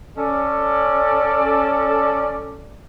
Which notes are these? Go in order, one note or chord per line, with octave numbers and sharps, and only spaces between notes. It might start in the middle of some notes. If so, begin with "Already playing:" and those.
C#4 A4 D5